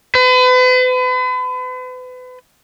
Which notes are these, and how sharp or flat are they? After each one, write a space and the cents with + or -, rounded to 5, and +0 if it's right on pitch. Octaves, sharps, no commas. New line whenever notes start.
B4 +40